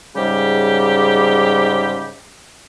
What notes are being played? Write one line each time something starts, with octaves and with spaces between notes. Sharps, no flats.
G#2 C#3 G3 G4